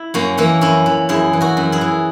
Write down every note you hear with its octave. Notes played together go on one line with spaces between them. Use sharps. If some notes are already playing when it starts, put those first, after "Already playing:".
Already playing: E4
F#2 A#3 C#4
E3 A#3 C#4
F#2 C#4 E4
E3
F#2 E4 G#4
E3
F#4 A#4
F#2
E4 G#4
E3